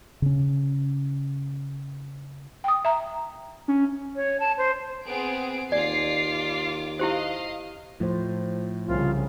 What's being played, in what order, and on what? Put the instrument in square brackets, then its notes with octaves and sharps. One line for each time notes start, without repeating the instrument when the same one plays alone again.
[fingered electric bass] C#3 C#4
[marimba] G5 D#6
E5 A#5
[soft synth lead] C#4
[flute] C#5
A5
C5
[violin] B3 [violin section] C4 G#4 D7
[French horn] D#2 [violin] F4 D6 [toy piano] D5 [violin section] C7
[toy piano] E4 G4 C5 [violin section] D#5 F5
[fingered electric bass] A2 [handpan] F3 C5
[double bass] C2 C#3 [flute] F4